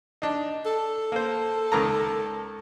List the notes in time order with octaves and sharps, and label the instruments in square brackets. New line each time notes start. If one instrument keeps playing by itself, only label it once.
[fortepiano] D4 D#4
[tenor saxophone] A4
[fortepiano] A#3 C5
C#2 D#3 A#5